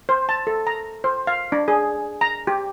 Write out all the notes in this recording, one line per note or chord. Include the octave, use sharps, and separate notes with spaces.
C5
A5
A4
A#5
C5
F5
D4
G#4
A#5
G4